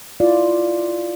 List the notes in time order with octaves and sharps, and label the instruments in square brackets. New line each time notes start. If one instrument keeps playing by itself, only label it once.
[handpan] E4 F4 D5